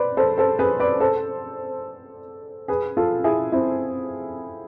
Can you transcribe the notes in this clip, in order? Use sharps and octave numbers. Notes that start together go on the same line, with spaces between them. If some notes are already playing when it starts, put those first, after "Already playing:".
Already playing: B4 C5 D5
A4 C5
A4 C5
G#4 B4
B4 D5
A4 C5
G#4 B4
F4 A4
E4 G#4
C4 E4